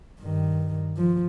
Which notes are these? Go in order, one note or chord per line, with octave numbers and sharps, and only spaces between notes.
G2 D#3
F3